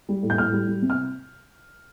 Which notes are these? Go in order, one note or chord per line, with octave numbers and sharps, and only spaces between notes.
G3
A2
G6
A2 F6
G3
G3
C3
F6